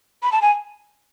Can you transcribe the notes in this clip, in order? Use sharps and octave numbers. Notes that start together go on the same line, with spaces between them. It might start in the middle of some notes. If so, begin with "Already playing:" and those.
B5
A5
G#5